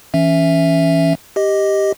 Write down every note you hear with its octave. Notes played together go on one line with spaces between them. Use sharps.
E3 C#4 E5
G4 D#5